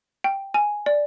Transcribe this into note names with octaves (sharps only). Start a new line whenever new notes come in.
G5
G#5
D5